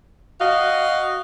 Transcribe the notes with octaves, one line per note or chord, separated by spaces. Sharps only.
F#4 D#5 F5